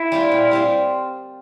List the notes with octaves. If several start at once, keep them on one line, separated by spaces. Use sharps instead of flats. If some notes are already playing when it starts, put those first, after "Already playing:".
Already playing: E4
G3 C4 F4
A#2
G3 C4 F4